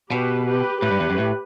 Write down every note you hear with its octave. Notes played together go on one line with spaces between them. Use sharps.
B2 G4 B4
G4 B4
A2 G4 B4
G2
E2
F#2
A2